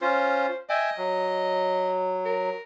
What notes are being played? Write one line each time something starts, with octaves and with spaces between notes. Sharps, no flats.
C#4 F4 C5
D#5 E5 G5 G#5
F#3
A#4